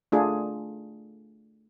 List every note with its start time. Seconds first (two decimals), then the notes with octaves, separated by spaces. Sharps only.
0.12 A3 D4 F4 G#4